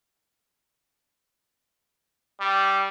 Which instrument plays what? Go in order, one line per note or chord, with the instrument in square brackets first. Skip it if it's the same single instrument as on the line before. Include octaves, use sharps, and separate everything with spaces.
[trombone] G3